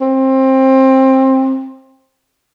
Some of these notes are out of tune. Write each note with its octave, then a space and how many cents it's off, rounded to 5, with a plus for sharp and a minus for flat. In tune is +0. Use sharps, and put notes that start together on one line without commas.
C4 +20